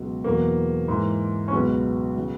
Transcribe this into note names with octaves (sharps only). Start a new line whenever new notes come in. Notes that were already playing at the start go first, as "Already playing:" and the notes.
Already playing: C#2 B2 F#3
E2 B2 F#3 A#3
G#2 E3
C#4
C#2 B2 F#3 B3
C#3 F#3